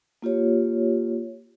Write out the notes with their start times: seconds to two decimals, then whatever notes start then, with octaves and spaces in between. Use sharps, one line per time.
0.22 A#3 F4 G4 C#5